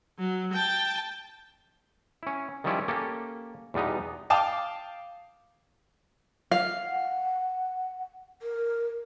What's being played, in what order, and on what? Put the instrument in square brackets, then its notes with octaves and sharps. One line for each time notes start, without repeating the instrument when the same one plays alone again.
[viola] F#3
G5 A5
[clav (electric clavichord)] C#4 E4
D#3 F3 G3 C#4 E4 F4
A#3 C#4 G4 A4
E2 B2 G3 B3 D#4
[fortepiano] F5 G5 A5 D6 D#6
[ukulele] F5
[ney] F#5
A#4